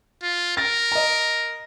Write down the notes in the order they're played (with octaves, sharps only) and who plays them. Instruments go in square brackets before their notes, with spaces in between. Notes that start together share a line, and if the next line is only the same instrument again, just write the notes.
[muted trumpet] F4
[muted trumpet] A#4 [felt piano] A6
[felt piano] D#5 A#5